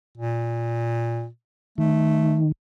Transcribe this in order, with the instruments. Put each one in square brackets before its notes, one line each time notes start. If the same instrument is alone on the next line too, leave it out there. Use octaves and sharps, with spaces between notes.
[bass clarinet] A#2
[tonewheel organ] D#3 [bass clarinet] A3